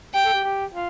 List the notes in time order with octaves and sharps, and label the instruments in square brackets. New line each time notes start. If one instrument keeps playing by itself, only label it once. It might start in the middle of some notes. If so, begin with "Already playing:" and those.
[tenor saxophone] G4 [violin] G5
[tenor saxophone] A4
G4
G4
F4